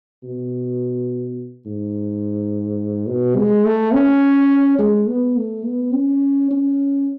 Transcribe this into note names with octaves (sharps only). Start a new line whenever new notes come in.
B2
G#2
B2
G#3
A3
C#4
G#3
B3
A3
B3
C#4
C#4